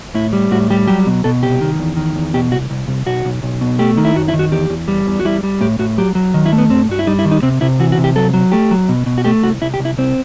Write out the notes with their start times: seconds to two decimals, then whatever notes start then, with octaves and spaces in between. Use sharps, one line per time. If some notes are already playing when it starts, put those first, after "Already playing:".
0.14 A2 E4
0.33 G3
0.51 A2 F#4
0.70 G3 G4
0.87 F#3 G4
1.07 B2
1.24 B2 A4
1.42 C2 G4
1.61 D#3
1.79 E2
1.97 D#3
2.16 E2
2.34 B2 G4
2.52 C2 F#4
2.70 C2
2.88 C2
3.06 B1 F#4
3.25 B1
3.43 B1
3.61 B2
3.79 A3 G4
3.97 D#3
4.05 E4
4.16 F#2 F#4
4.28 E4
4.34 D#3
4.39 F#4
4.52 E2 G4
4.70 E2
4.88 G3
5.07 E2
5.20 F#4
5.25 G3 E4
5.43 G3
5.61 A2 G4
5.79 A2 F#4
5.98 F#3 G4
6.15 F#3
6.34 D#3
6.46 E4
6.52 A3
6.58 B3
6.70 G2 C4
6.89 G2 F#4
6.99 E4
7.07 G3 D#4
7.19 E4
7.25 D#3
7.31 D#4
7.42 C3 C4
7.61 C3 E4
7.80 E3 F#4
7.92 F#4
7.98 C3
8.04 G4
8.16 F#3 A4
8.34 F#3
8.52 A3 G4
8.71 F#3
8.89 B2
9.06 B2
9.18 F#4
9.25 A3 G4
9.43 C2 F#4
9.62 C2 E4
9.74 G4
9.79 C2
9.85 E4
9.98 C2 C4